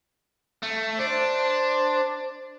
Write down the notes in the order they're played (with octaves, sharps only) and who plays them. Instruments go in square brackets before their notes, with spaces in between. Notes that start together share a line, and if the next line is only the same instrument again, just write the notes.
[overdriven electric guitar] A3
[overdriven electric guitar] D4 [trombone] C5